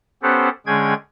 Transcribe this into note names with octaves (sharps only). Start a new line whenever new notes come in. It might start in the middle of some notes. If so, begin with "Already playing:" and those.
B3 C#4 G4 A4 C5 F#5
D3 G#3 C#4 G#4 G5 G#6